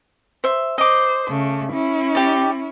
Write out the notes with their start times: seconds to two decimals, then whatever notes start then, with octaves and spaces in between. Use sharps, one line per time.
0.44 C5 E5
0.78 C5 D#5 D6
1.30 C#3 A3
1.71 C#4 E4
2.15 G4 D5